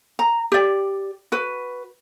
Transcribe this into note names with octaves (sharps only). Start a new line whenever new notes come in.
A#5
G4 D5
F#4 B4